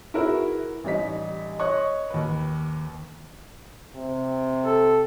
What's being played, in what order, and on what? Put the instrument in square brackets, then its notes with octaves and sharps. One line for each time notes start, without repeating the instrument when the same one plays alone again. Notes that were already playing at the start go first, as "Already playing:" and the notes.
[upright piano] E4 F#4 G#4 A#4 B4 E5
A1 G3 D#4 B6
C#5 D#5 C#6 F#6
D#2 B4
[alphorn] C3
[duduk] A4